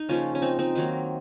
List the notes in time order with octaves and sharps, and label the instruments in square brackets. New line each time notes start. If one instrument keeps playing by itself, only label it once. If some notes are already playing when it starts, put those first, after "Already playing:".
Already playing: [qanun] D#4
C#3 F3 A#3 C#4 F4
C#4
C4 D#4
C4 D#4
D#3 F#3 A#3